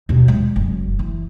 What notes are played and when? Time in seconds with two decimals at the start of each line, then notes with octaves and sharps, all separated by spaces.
0.09 D#2 B2
0.28 G#3
0.56 F#1
0.99 E3